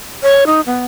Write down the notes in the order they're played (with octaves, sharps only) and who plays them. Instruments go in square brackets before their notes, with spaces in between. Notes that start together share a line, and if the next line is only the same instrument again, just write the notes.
[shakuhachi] C#5
D#4
B3